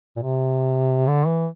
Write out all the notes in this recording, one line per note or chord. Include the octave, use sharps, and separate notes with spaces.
A#2
C3
D3
E3